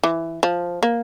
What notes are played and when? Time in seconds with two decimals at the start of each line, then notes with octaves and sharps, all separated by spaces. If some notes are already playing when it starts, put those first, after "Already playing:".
0.04 E3
0.43 F3
0.83 A#3